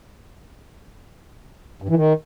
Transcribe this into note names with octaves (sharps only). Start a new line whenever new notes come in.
G2
E3
D#3